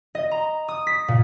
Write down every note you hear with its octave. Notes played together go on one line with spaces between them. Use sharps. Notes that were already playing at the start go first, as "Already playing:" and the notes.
D#5
A#5
D#6
B6
A#2